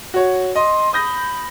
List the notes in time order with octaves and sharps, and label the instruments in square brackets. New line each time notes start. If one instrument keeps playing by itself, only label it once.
[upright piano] F#4 C#5
[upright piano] D#5 [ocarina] C6
[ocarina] B5 [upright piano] D#6 G6 A#6